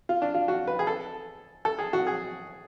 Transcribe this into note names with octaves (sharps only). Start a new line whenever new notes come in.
F4
D4
F4
F#4
B4
G#4
A4
A4
G#4
F#4
G#4